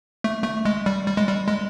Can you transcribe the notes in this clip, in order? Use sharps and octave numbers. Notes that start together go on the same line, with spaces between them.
A3
A3
G#3
G3
G3
G#3
G3
G#3